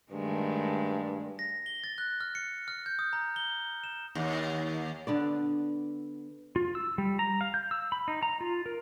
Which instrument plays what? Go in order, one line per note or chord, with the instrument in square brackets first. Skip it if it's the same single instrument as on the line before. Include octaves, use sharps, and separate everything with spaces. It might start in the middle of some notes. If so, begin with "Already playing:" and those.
[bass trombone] G2 [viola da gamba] D#3 G#3 A3
[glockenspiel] A#6
G7
A6
F#6
F6
C#7
F6
G6
D#6
A#5
G7
E7
[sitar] D#2
[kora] D3 B3 D5
[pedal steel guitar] F4
E6
G3
A#5
F5
G6
E6
B5
D#4
A#5
F4
A#4